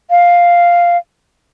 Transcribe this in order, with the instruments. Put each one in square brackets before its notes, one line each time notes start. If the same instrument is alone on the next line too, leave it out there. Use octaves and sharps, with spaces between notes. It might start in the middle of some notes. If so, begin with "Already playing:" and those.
[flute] F5